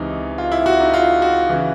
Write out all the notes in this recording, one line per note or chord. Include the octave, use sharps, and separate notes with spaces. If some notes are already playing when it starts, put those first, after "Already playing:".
Already playing: C#2 C3 E3 D#4
F4
E4
F#4
D#4
F4
F#4
C#3 E3